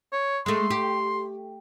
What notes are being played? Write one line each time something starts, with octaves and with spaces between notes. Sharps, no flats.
C#5
G#3 A3 C6
G4